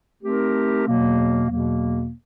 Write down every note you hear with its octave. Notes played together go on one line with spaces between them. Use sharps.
A3 C4 D#4 G4 A#4
E2 B2 F#3 A#3
E2 B2 F#3 A#3